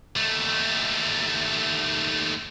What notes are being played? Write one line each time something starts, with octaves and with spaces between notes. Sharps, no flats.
D#2 A3